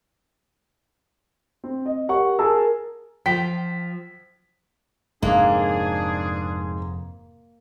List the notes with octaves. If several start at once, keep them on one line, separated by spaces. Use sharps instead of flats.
C4
D#5
G4 A#4 C#5 F#5 C#6
G#4 A#4 A5 E6
F3 G5 B6
F1 G#2 A#3 C4 D4 G#4